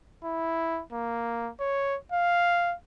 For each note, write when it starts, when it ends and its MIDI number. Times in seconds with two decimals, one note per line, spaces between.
0.24 0.81 64
0.92 1.51 58
1.60 1.96 73
2.12 2.75 77